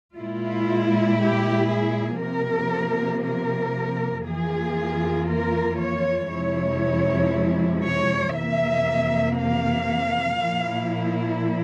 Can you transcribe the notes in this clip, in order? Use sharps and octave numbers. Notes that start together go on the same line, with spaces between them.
A#2 G#3 E4 F4
G4
G#4
C3 F3 A#3 A#4
A#4
F2 E3 A#3 F4 G#4
A#4
C#5
F2 C3 F3 G#3 E4 C#5
C#5
F2 C3 E3 A#3 E5
F5
A#2 F3 A#3 E4